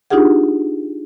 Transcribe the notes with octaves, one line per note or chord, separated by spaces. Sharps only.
D4 D#4 F4 G4 G#4 F#5